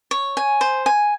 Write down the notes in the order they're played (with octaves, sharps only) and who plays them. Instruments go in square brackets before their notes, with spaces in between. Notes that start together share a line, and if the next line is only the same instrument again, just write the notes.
[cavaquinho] C#5
G#5
C5
G#5